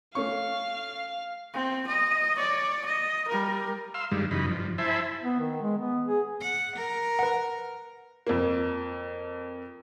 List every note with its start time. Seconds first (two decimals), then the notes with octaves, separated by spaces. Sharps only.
0.15 A3 C#4 F5 C#6
1.54 C4
1.87 D#5
2.36 C#5 D5
2.85 D#5
3.28 G3 A#4
3.94 F5 C6 E6
4.11 G2 D#3 G3 G#3
4.31 F#2 C#3 E3 D#4 B5
4.47 G2 F3
4.78 E4 C5 E5 G#5 A5 B5
5.22 B3
5.40 D#3
5.62 G#3
5.77 B3
6.08 G#4
6.41 F#5
6.76 A#4
7.19 B4 F#5
8.27 F2 A#3